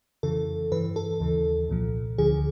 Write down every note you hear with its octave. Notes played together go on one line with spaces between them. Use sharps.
F2 C#3 E3 A4
G2 E3 B4
A4
D#2 C#3 E3
C2 A#2 F3
D2 D3 F3 G#4